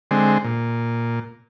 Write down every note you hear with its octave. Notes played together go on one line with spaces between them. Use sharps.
D3 G#3 C4
A#2